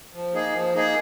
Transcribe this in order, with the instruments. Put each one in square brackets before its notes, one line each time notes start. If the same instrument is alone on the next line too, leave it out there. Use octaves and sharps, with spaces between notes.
[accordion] F3
A#3 D#4 G#4
F3
A#3 D#4 G#4